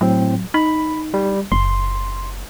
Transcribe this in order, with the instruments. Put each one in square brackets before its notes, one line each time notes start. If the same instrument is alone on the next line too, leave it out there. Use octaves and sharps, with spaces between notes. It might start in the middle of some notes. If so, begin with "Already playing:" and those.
[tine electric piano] A2 C4 [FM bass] F#3
[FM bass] D#4 [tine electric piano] B5
[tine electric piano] G3
[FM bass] F#1 [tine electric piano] C6